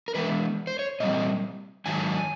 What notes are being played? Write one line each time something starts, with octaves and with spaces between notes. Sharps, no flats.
A#4
E3 G#3 B3 B4
C5
C#5
A#2 G3 C4 D#5
G#2 D#3 F#3 G#5